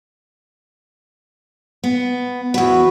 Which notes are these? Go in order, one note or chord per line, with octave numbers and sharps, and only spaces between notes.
B3
E2 F#4 B4